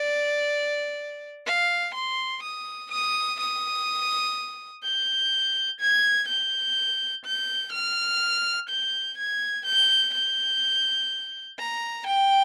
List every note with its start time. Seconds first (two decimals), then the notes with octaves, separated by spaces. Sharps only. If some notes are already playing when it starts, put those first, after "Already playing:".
Already playing: D5
1.47 F5
1.95 C6
2.43 D#6
2.91 D#6
3.40 D#6
4.84 G6
5.80 G#6
6.28 G6
7.25 G6
7.73 F6
8.69 G6
9.18 G#6
9.66 G6
10.14 G6
11.59 A#5
12.07 G5